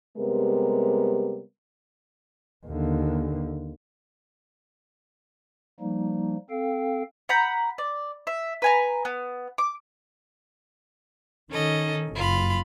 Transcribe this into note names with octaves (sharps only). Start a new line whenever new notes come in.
C3 G3 G#3 B3 G4 A#4
D#2 D3
F3 G3 A#3 D#4
C4 A4 F5 G5
F#5 A#5 B5 G6
D5
E5
B4 G#5 A#5
B3
D6
D#3 C#4 A4 D#5
F#1 F4 B5